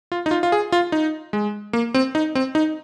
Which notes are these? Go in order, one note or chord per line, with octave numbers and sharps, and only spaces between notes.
F4
D#4
F4
F4
G#4
F4
D#4
G#3
A#3
C4
D#4
C4
D#4